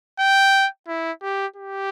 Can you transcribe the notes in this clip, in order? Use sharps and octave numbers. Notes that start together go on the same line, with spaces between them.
G5
E4
G4
G4